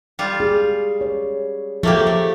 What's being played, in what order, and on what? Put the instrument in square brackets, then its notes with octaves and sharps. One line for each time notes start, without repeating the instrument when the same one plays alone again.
[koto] G3 F4
[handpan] G#4
C#5
[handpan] F3 [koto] A3 A#3 G4
[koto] A3